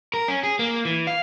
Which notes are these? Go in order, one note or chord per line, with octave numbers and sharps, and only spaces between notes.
A#4
C#4
G#4
A#3
E3
F5